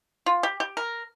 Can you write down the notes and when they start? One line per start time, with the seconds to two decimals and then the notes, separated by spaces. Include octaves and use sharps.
0.26 F4
0.43 G4
0.60 G4
0.77 A#4